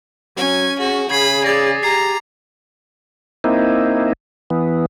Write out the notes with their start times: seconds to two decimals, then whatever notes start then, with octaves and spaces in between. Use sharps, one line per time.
0.37 F#3 C#4 G#5
0.79 F#4 G#4
1.10 C#3 G#4 B5 G#6 C7
1.44 D5 D6 A6 A#6
1.83 G4 A#5 A6 C7
3.44 A#3 C4 D#4 E4
4.50 E3 B3